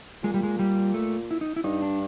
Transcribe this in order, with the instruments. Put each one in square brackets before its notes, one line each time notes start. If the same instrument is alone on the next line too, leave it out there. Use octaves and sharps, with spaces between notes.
[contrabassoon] A#2 [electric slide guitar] G#3
[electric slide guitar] G3
G#3
G3
A3
E4
D#4
E4
[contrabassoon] G2 [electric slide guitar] D#4
[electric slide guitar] D4